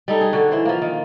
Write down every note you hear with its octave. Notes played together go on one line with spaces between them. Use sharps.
G3 D#4 A4
G#4
D3 F#4
E3 C5
F3 A#3
D#3